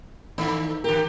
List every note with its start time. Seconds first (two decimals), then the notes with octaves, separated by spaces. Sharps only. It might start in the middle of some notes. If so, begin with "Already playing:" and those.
0.38 D#3 A3 D#4
0.84 D3 G4 A#4